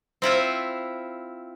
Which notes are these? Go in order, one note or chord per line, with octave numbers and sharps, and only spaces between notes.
C4 E4 F4 E5